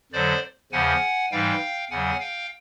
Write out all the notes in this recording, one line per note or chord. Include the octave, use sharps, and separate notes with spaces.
F2 D3 F#3 C5 D5
E2 C#3 F3 F#5 G#5
G#2 E3 G3 F5 G5
E2 C#3 F#3 F#5 G#5
F5 G5